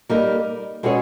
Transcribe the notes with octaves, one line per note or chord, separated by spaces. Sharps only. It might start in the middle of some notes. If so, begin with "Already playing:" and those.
G3 A#3 D#4 A#4
B2 G#3 C#4 G#4 C#5